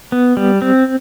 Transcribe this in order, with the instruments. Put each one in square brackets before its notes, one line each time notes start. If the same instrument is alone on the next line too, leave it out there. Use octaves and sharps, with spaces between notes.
[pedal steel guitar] B3
G3
C4